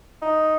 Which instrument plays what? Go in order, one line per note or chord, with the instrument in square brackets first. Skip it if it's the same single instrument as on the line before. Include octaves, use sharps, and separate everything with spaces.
[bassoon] D#4